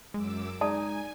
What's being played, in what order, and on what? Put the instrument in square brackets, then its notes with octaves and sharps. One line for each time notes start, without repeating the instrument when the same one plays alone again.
[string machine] F#2 D6 E6 [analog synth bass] G#3
[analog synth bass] G#3 [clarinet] D#4 [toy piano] D5 A5 D#6 [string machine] G#5